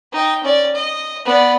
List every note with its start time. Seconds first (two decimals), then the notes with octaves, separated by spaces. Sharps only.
0.13 D#4 G5
0.43 C#4 D5
0.75 D#5
1.26 B3 D5